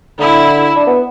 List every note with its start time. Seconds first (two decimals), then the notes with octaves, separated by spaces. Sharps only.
0.19 D3 E4
0.76 D4
0.87 B3